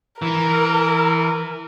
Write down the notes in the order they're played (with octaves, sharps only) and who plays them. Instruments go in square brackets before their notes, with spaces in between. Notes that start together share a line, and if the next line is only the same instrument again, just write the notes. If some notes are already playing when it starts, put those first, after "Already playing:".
[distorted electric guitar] E3 [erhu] A#4